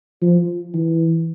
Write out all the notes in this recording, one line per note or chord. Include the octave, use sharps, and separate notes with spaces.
F3
E3